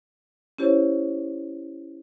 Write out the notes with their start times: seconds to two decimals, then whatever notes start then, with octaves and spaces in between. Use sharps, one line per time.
0.58 C#4 E4 G4 C5 C#5